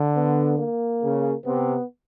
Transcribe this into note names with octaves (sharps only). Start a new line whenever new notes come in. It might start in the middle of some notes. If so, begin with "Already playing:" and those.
Already playing: D3
B3
A#3
C#3
C3 B3